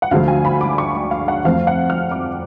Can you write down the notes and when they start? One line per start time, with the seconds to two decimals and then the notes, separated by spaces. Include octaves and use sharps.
0.02 F#5
0.11 D2 D3 F3 A3 F5
0.28 G#5
0.45 B5
0.61 D6
0.78 C#6
0.95 D6
1.11 F5
1.28 F#5
1.45 F2 F3 A3 F5
1.67 F#5
1.90 F6
2.11 D6